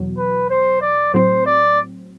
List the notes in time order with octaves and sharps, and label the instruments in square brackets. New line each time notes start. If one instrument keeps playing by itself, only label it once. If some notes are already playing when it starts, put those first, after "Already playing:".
Already playing: [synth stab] E2 B2 F#3
[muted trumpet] B4
C5
D5
[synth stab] A2 F#3 C4 [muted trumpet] C5
[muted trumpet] D5